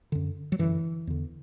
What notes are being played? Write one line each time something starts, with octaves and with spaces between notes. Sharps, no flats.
F#2 D3
F#3
F#2 D3 E3
E2 D3